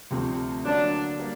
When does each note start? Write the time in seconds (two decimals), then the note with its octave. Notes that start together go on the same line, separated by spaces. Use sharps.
0.11 D2 C3 F3 A3 C4
0.65 D3 F#3 A#3 C#4 D4
1.20 G3 A#3